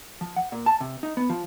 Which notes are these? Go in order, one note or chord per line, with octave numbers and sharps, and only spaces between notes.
F3
F#5
A#2
A5
C3
D#4
B3
F3